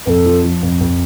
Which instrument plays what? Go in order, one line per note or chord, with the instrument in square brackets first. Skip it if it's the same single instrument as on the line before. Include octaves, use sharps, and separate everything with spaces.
[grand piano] F2 [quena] A4 B4
[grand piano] F3
F3
F2
F2